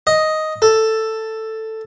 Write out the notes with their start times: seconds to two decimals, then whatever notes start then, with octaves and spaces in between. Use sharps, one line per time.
0.07 D#5
0.62 A4